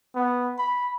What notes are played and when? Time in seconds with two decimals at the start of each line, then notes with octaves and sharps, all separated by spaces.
0.15 B3
0.58 B5